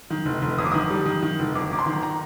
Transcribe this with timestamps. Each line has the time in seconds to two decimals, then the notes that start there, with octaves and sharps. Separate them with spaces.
0.10 D#3
0.25 F1
0.42 F1
0.58 G1 D#6
0.66 D6
0.72 D#3 D#6
0.90 G3
1.06 D#3
1.23 D#3
1.39 F1
1.55 G1 D6
1.71 G1 D6
1.79 C6
1.86 D#3
2.03 A#5